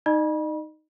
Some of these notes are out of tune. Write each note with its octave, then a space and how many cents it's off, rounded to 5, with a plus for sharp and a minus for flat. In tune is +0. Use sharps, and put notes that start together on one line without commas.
D#4 +0 D#5 -40 B5 -40